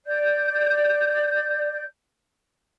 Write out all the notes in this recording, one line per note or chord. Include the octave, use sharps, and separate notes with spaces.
D5 G6